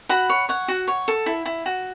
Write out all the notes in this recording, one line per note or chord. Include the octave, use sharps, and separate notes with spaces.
F#4 F#5 B5
C#5
C#5 F#5
F#4
C#5
A4
E4
E4
F#4